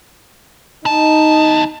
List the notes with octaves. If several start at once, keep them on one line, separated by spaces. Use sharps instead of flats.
E2 D#4 A5